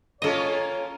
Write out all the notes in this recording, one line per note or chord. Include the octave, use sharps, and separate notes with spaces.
A#3 C#4 F4 A4 C#5 D#5